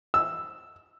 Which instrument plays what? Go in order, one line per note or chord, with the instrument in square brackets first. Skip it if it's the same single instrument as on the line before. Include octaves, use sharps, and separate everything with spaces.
[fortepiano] E6